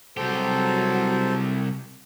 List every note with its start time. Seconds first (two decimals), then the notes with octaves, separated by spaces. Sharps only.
0.17 C2 F#3 G4 A4 C5